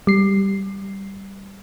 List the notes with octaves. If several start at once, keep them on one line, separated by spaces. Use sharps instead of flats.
G3 C7